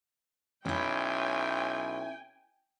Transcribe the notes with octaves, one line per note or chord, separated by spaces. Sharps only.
B1 C#4 E4 G5 G#5